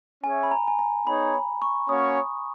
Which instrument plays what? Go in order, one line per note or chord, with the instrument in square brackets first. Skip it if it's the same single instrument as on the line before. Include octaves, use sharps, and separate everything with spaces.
[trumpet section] C#4 G#4 C#5 E5 [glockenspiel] G#5
[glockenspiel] B5
A#5
G#5
A#5
[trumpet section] B3 D#4 G#4 C#5 [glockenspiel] B5
[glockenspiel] B5
C#6
[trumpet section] A#3 C#4 F#4 C#5 [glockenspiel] D#6